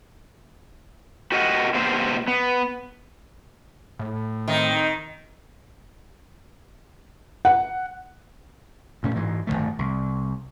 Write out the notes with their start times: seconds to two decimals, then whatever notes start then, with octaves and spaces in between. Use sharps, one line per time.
1.32 F#4 G4 A#4 D#5 E5 F#5
1.74 B2 A#3 B3 G4 C5
2.28 B3
3.99 A2
4.48 D#3 C4 D#4
7.45 F#5
9.03 D2 A#2 A3 C#4
9.16 G#2 E3 G#3
9.47 G1 F2 D#3 A3
9.79 C2